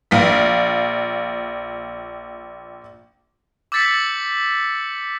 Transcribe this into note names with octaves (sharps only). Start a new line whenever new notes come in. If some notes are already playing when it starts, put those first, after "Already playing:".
A#1 F5 B6
D6 E6 G6 A6 B6 C#7